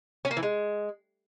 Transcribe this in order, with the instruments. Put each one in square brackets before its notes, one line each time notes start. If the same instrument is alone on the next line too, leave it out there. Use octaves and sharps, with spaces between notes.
[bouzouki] C#4
A#3
E3
G#3